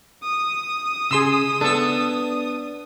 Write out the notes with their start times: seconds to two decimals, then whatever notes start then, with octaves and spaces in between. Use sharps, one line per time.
0.23 D#6
1.11 C#3 G#4 C6 E6
1.61 B3 D4 A4 E6